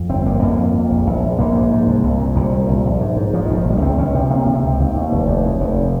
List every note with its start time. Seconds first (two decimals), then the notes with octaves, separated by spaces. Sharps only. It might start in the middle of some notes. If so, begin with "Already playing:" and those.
Already playing: F2
0.09 G1 C4
0.26 G1 A#3
0.42 F2 A#3
0.59 F2
0.74 F2
0.90 A#1
1.06 A#1
1.23 A#1
1.39 A#1 A#3
1.55 G#2
1.71 G#2
1.87 C2
2.03 C2
2.19 A#2
2.36 C2 G3
2.52 A#2
2.68 C2
2.85 A#1
3.00 G#2
3.17 G#2
3.33 G#2 F3
3.45 D#3
3.49 A#1
3.58 F3
3.65 A#1 G3
3.81 C#2 C4
3.98 C#2 C#4
4.14 C3 C4
4.30 C3 A#3
4.46 C3
4.55 C4
4.63 C#2
4.79 D#2
4.95 D#2
5.12 F1
5.27 D#2
5.44 D#2
5.60 F1